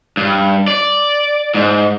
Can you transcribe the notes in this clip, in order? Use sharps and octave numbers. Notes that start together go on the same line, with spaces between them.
G2
D5
G#2